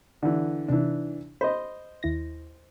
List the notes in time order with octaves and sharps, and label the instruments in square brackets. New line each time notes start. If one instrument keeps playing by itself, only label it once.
[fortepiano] D3 E3
[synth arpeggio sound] C3 D#4 [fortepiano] E3 D4
[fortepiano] C5 D#5 [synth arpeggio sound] B5
[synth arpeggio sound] D#2 E4 A#6